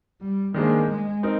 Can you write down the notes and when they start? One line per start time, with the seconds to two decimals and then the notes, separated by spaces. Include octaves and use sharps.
0.21 G3
0.54 D#3 G#3 A#3 D4 G#4 C5
0.89 G#3
1.23 C4 D#4 A#4